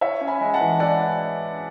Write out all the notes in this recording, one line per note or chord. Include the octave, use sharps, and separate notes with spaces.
E4 C#5 E5
C#4
G#5 B5
G#3
F#5 A5
E3
E4 D5 F#5